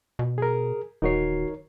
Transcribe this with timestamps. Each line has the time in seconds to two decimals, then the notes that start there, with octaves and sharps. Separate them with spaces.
0.19 B2
0.38 G#4 A#4
1.02 D#1 D#3 D#4 F#4 A#4 C#5 C7